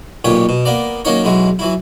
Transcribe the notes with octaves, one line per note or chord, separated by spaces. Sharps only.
B1 F2 A#2 G4 C#5
B2
A#3 B3 D5
F#3 A#3 C#4 D#4 C#5
B1 E3 F#3 G#3
E3 F#3 E4